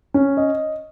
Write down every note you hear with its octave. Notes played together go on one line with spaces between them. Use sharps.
C#4
D#5